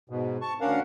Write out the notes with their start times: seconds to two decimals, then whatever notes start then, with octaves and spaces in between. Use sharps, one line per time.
0.10 G#2 B2
0.42 A5 C#6
0.61 D2 C#4 D4 A#4 F5 F#5